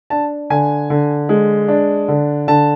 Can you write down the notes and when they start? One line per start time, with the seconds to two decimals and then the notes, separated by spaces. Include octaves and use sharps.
0.10 D4 A5
0.50 D3 G#5
0.90 D3
1.29 G#3
1.68 D4
2.08 D3
2.48 D3 A5